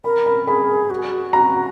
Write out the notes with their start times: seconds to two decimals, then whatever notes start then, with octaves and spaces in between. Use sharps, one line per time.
0.04 A#4 B5
0.26 B5
0.48 G#4 B5
0.90 F#4
1.33 A#5